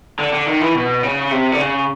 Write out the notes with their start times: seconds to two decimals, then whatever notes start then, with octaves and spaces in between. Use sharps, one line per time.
0.19 D3
0.33 D3
0.46 D#3
0.60 E3
0.75 B2
1.03 C#3
1.31 C3
1.52 D3
1.59 C#3